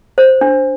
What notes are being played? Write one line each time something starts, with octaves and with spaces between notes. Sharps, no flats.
C5
D4